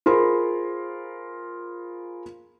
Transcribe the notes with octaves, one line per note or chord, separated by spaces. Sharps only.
F4 G#4 A#4 C5 B5 C6